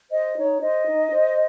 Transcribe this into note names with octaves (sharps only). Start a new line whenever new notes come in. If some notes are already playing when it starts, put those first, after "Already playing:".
C5 D#5
D#4 C#5
C5 D#5
D#4
C5